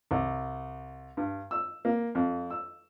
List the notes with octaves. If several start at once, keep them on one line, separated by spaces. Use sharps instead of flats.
C2
G2
E6
A#3
F2
E6